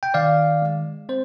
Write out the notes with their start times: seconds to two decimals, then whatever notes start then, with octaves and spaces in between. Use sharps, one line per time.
0.03 G5
0.14 D#3 D5 F5
0.62 G#3
1.09 C4 C5